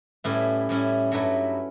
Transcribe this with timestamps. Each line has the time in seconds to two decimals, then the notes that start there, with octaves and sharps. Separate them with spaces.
0.24 A2 G3 C#4 E4 B4
0.69 A2 G3 C#4 E4
1.12 G2 F#3 A3 E4 B4